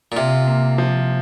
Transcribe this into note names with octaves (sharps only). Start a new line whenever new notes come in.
A#2
C3 F4
A#3
F3